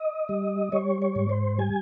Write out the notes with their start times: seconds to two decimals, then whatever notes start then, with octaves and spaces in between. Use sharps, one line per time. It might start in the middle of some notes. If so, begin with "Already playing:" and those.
Already playing: D#5
0.29 G3
0.72 G3 C#5
1.02 C#5
1.16 G#2
1.29 C5
1.58 G3 G#5